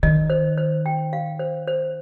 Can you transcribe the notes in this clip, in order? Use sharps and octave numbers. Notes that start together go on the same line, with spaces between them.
D#3 D#5
C5
C5
G5
F5
C5
C5